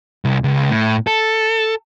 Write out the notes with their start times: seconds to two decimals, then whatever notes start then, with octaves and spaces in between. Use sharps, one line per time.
0.25 C2
0.44 C#2
0.70 A2
1.07 A4